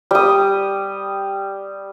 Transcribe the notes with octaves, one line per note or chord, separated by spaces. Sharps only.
G3 D#6